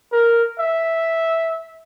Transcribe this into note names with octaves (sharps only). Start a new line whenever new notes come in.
A#4
E5